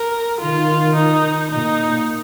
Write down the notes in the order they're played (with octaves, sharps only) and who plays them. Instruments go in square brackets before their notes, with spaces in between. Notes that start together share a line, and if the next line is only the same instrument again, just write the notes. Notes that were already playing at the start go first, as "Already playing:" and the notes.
Already playing: [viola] A#4
[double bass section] D#3 [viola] F4
[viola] D#4
[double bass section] A#2 [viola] D#4